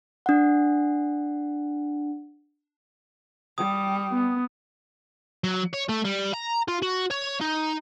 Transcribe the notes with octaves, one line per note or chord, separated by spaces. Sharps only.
D4 F#5
G3 D#6
B3
F#3
C#5
A3
G3
A#5
F4
F#4
C#5
D#4